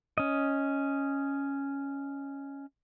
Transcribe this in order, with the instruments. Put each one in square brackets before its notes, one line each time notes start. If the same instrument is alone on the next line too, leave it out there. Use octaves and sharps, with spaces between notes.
[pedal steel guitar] C#4 D#5